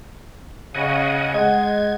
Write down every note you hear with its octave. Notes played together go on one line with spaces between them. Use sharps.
C#3 D#5 F#5 G#5
G#3 D#5 F#5 G#6